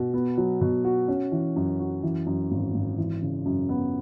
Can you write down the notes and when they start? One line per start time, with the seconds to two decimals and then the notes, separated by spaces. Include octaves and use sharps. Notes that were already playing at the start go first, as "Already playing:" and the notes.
Already playing: B2
0.14 B3
0.37 F#3
0.61 B2
0.84 F#4
1.08 C#4
1.32 E3
1.56 F#2
1.79 F#4
2.03 E3
2.26 F#2
2.51 G#1
2.74 G#1
2.98 E3
3.22 C#3
3.45 F#2
3.69 B3